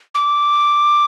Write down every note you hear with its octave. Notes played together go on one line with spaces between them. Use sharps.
D6